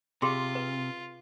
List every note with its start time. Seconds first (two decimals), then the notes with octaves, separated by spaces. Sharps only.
0.22 C3 F4 G4 G#4 C6
0.55 B4